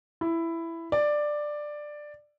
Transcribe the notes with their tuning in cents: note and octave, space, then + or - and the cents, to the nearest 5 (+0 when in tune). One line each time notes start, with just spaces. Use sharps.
E4 +10
D5 +10